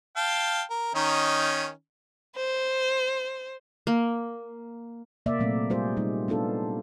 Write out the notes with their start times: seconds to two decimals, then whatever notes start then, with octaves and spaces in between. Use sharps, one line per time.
0.17 F5 G5 A5
0.70 A#4
0.95 D#3 C#4 D#4
2.36 C5
3.87 A#3
5.26 C3 A#3 D5 E5
5.39 A#2 F#3 A3 C4
5.70 G3 F4 G#4 C5
5.97 G3 D#4
6.28 B3 D4 F4 A4